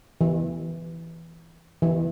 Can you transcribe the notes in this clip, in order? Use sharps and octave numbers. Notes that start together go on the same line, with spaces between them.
E3
E3